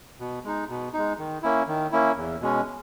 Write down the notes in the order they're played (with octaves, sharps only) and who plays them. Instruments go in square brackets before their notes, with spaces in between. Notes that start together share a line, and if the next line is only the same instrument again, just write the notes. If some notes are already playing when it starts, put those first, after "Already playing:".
[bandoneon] B2
G#3 D#4
B2
G#3 D#4
D#3
A#3 C#4 E4
D#3
A#3 C#4 E4
E2
B2 G#3 C#4